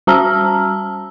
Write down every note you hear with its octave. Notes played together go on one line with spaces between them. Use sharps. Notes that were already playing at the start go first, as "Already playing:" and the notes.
G3 F#4 A5 A#5 E6 F6